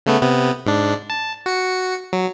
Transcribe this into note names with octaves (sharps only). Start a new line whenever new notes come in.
C#3 A3 B3
C3 B3
G#2 D4
A5
F#4 C#7
F#3